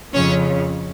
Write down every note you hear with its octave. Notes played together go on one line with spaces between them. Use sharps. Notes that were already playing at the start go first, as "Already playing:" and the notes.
F2 C#3 F3 C#4 C#5